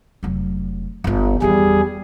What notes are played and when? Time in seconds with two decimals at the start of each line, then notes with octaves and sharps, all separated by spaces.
0.23 F1 F#3
1.04 G1 F4
1.42 E2 D#3 G3 G#4